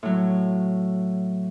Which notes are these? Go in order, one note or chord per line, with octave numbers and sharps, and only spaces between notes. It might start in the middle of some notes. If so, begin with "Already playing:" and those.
A2 F#3